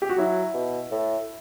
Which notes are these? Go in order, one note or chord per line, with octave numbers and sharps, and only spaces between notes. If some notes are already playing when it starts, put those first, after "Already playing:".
G4
F#4
F#3 E4
B2
A2